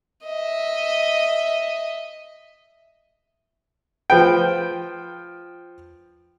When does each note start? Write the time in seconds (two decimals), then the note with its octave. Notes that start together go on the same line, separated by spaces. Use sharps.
0.24 D#5 E5
4.10 F3 B4 G5